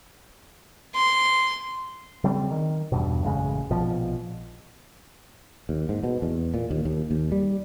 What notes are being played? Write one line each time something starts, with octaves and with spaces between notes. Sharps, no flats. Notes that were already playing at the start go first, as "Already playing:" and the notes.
C6
C#3 F#3 G3 C4
D#3
E2 G2 B2
A1 F#2 C#3 G#3
A#1 B2 F3
D#2
G#2
B2
E2
A#2
D#2
D#2
D#2
G3